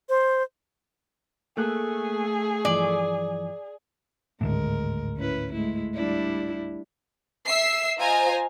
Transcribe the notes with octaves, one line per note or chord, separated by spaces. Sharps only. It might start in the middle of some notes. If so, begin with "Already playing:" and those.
C5
A3 A#3 G#4 A4 F#6
G2 E3 F3 D5
G#1 D2 A2 G#3 A#4
C#4 E4 B4
G#3 A3 E4
G3 D4 E4
E5 E6 C7
F4 C5 D#5 G#5 A#5